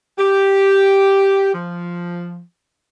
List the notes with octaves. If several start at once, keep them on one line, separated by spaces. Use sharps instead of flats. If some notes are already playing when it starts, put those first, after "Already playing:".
G4
F3